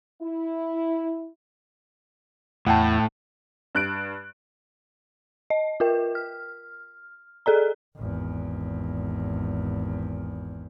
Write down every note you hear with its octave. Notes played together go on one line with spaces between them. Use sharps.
E4
E2 A2 E4 F#5 G5 A5
G2 F#6 D7
D#5
F4 A#4 G5
F6
G#4 A4 D5 A#5
G#1 E2